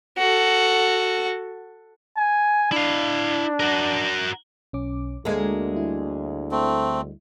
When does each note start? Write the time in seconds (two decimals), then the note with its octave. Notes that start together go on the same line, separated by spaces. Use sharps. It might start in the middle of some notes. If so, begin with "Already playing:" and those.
0.18 F#4 A4
2.17 G#5
2.72 D4 E4 F5
3.60 F#4 A#4
4.73 B1 C#4 D6
5.25 D2 G#3 A#3 A4
5.72 G3 E4
6.51 A3 C4